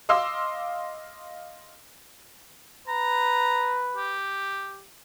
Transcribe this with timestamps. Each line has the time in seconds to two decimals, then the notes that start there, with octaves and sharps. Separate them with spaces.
0.09 D#5 F5 C6 D6 E6
2.88 B4 A#5
3.97 G4